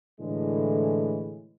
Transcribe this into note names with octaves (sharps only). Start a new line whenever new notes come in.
A2 D3 E3 G#3